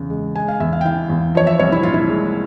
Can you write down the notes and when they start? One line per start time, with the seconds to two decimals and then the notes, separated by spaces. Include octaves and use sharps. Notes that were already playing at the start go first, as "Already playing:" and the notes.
Already playing: E2 C#3
0.10 G#3
0.36 G#3 G#5
0.48 F5
0.60 E2 E5
0.73 F5
0.81 G5
0.85 E3 F5
1.10 E2
1.35 F3 C#5
1.47 E5
1.59 C2 C#5
1.72 E4
1.83 A#2 F4
1.94 E4
2.09 G#3